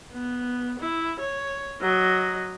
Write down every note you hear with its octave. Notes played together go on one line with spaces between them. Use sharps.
B3
E4
C#5
F#3 D#5